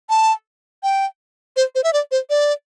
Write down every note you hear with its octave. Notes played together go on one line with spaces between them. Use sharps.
A5
G5
C5
C5
E5
D5
C5
D5